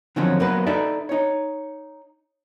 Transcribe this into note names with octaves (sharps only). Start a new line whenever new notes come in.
D3 D#3 F3 F#3 C4 C#4
F#2 F#3 A#3 B3 B4
D#4 A4 B4 D5 E5
D#4 C#5